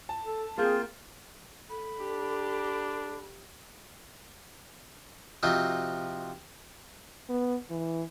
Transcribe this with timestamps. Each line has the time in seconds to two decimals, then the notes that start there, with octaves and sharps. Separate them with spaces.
0.09 A5
0.24 A4
0.58 A#3 C4 F4 G#4 G6
1.70 A4 B5
1.98 D4 G4
5.43 C3 F3 C4 D#4 F4 F#4
7.29 B3
7.70 E3